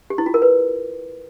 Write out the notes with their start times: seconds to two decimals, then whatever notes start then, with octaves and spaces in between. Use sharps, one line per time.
0.10 G4
0.18 E4
0.26 F4
0.34 A#4
0.42 B4